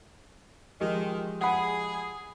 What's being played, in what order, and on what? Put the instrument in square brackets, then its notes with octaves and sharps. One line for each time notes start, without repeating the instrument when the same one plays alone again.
[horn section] D#3 [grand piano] F3 G#3 G4
[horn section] G#4 [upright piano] F#5 B5